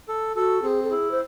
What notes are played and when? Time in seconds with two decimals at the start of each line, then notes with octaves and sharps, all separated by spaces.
0.08 A4
0.36 F#4 A4
0.63 C4 G#4
0.83 A4
0.90 E4 G#4
1.11 C5